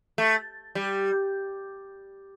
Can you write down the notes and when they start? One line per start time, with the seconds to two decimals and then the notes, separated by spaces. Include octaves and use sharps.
0.18 A3
0.75 G3